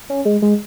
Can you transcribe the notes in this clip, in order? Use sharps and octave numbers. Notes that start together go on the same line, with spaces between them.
C#4
G#3
G#3